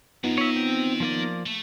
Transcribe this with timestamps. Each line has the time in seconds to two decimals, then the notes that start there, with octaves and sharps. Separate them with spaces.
0.24 F2 B3 D#4 F4
0.38 A#4 C#5 D#5 E5
0.56 C4
1.00 F3 A#3 D5
1.46 A3